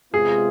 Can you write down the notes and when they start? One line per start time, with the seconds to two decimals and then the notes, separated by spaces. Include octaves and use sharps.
0.13 C3 G#3 B3 F4 G#4